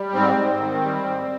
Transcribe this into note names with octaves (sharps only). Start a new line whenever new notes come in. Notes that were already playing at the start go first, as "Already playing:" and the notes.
Already playing: G3
G#2 C4
G#2
D#3
G3
G#2